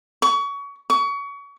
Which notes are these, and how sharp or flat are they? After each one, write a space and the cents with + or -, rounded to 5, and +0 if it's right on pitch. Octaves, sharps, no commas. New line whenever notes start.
C#6 +30
C#6 +30